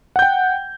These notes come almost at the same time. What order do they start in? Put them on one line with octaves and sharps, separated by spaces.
F#5 G6 G5